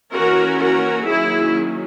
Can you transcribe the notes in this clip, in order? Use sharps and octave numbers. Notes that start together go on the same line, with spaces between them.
E3 A#3 C#4 F#4 A#4
F#4 A#4
D#3 F#3 A#3 C#4 E4 G#4